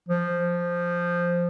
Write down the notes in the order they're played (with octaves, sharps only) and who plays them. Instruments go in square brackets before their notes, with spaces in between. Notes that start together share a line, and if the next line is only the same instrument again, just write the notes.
[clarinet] F3